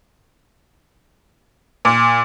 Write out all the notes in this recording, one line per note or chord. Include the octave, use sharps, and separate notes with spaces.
A#2